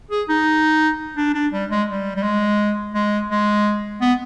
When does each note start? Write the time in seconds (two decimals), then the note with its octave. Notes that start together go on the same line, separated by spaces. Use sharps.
0.11 G#4
0.29 D#4
1.17 D4
1.35 D4
1.53 G3
1.71 G#3
1.89 G3
2.16 G3
2.23 G#3
2.94 G#3
3.30 G#3
4.01 B3